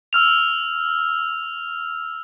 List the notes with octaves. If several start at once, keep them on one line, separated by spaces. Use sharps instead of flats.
E6 F6 F7